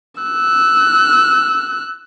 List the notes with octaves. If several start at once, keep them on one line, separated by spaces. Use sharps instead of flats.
E6 F#6